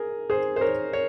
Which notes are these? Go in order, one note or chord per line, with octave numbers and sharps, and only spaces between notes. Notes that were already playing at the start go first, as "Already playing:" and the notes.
Already playing: G#4 A#4
G#4 C5
C5
A#4 C#5
C#5